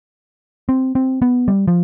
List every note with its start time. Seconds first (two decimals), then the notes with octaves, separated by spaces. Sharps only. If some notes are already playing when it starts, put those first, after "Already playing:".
0.69 C4
0.95 C4
1.22 B3
1.48 G3
1.68 F3